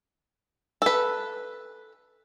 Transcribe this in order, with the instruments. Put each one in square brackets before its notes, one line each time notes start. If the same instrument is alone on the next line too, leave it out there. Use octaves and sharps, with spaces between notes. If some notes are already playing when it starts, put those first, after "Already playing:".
[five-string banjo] A4 B4